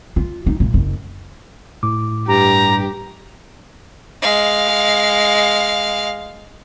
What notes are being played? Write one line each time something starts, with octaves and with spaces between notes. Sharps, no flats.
F4
D#4
A#2
F#1
A2 D6
G2 G4 A#5
G#3 F5